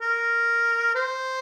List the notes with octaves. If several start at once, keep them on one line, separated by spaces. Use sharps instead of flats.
A#4
C5